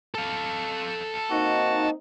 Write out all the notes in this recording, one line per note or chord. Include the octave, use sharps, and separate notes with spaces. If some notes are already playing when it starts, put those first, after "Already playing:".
A4 F5
A#3 C4 D#4 F#4